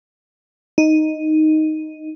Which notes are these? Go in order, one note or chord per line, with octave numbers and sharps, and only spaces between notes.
D#4